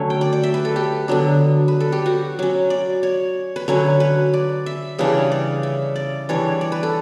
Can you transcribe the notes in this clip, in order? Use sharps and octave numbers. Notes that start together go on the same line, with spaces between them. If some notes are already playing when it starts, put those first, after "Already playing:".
Already playing: D3 F#3 A3 C#4 C#5
G5
D5
D5
E5
B4
A4
G4
D3 F#3 B3 D4
B4
A4
G4
F#4
F#3 C#4
D5
C#5
B4
D3 F#3 C#4 C#5
B4
D5
E5
C#3 E3 G3 D4
D5
E5
D5
E3 G3 D4 C#5
D5
B4
A4